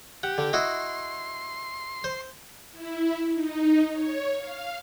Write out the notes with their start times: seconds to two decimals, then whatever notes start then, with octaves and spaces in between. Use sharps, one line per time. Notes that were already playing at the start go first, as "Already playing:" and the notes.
0.23 G4 F#5
0.38 D3
0.53 E4 F#4 D#5 C6
2.04 C5
2.72 E4
3.34 D#4
3.92 C#5
4.36 F5